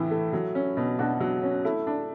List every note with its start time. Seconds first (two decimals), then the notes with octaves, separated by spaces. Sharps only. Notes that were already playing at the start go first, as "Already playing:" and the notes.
Already playing: A2 E3 E4
0.11 A3
0.33 F#3
0.55 C#4
0.77 B2
0.99 B2 D4 F#4
1.20 F#3
1.43 C#4
1.65 A3 E4
1.87 D4